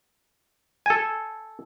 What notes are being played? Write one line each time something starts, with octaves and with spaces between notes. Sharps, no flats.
A4 G#5